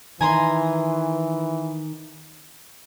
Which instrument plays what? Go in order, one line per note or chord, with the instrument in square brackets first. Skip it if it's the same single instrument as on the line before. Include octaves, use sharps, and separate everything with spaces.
[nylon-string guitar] D#3 E4 [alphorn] E3 [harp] G#5 A#5 C6